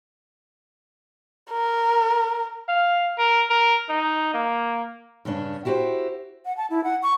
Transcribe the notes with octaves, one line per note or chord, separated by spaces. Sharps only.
A#4
F5
A#4
A#4
D#4
A#3
G2 C#3 C#4 D4
E4 F#4 G4 A#4 C5
F#5
A5
E4
F#5
C#6